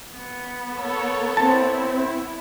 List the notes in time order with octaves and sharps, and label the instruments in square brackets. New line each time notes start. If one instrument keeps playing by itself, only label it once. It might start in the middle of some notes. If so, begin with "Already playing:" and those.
[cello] B3
[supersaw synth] A4 C#5
[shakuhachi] C4 [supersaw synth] E4 [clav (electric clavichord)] A5